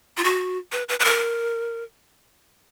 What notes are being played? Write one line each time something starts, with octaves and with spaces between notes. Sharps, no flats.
F4
F#4
B4
B4
B4
A#4